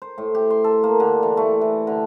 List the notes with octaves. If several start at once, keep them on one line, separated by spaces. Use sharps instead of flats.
C5
A2
G4
C6
A4
A#3
D3
E3
A3
E3
D3